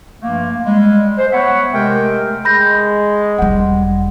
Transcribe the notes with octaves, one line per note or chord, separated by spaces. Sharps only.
G2 F3 A3 A#3
G3 G#3
G#3 C5
B3 C#5 E5 F#5
C3 G#3 A3 A#4 E5 G5
G#3 B5 G6 A#6
E1 G3 F#5